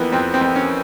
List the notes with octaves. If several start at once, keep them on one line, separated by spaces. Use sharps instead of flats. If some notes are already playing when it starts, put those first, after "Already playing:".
Already playing: F2 E3 A#3 B3 F4
F2 C4
C4
F2
C#4